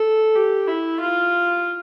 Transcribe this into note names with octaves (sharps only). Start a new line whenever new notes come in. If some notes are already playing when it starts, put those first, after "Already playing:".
Already playing: A4
G4
E4
F4